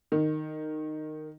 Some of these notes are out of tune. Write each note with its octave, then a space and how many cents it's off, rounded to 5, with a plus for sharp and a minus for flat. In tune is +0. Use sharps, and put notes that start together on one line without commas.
D#3 -10